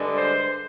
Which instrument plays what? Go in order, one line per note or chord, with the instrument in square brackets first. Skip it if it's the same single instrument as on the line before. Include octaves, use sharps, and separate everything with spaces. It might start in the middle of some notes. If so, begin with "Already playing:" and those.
Already playing: [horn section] G2 D3 G#3
C5